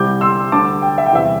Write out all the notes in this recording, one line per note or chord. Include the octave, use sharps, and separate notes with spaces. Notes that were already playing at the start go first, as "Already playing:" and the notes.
Already playing: C2 C3 G3 D6 G6
C6 E6
D2 D3 G3 A5 D6
G5
E5
G5
E2 C3 G3 E5